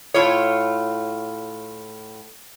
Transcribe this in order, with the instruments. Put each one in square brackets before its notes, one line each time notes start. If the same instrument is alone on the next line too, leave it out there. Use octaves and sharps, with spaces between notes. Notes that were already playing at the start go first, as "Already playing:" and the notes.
[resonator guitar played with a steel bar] A2 F4 C#5